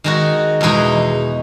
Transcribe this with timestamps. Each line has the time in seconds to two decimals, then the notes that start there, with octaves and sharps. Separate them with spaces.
0.04 D#3 G#3 D#4 F#4
0.61 E2 B2 G#3 D#4